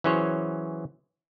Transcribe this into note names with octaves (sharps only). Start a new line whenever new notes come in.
E3 F#3 C#4 G#4 C5 C#5